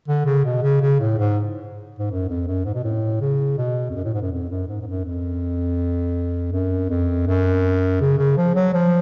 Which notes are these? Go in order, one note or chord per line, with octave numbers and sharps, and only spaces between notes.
D3
C#3
B2
C#3
C#3
A2
G#2
G#2
F#2
F2
F#2
G#2
B2
A2
C#3
B2
F2
F#2
A2
G#2
F#2
F2
F#2
G#2
G#2
F#2
F2
F#2
F2
F#2
C#3
C#3
F3
F#3
F3